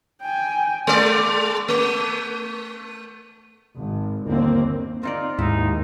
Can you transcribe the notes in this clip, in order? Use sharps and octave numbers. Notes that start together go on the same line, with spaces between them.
G5 G#5
G#3 D5
A3
G#1
G1 D#2 A#3 C4
C4 D#4 F4 D5
D#2 G#2 D#4 E4